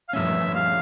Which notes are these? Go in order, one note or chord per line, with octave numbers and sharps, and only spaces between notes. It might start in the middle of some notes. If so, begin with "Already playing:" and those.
F5
G2 F3 A3 C#4 E5
F5